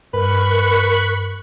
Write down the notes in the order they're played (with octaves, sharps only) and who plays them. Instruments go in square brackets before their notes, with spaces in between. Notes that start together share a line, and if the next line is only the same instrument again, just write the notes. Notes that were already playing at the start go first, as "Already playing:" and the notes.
[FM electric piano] G2 [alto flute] A#4 [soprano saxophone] B4 [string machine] B5 C#6 F#6